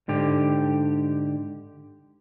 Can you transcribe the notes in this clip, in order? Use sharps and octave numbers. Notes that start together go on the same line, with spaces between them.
G#2 D3 G4